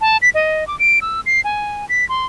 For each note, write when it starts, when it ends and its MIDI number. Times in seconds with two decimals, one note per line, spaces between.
0.01 0.17 81
0.22 0.30 95
0.34 0.67 75
0.67 0.78 86
0.79 0.99 98
1.01 1.21 88
1.26 1.41 96
1.44 1.88 80
1.89 2.07 95
2.09 2.26 84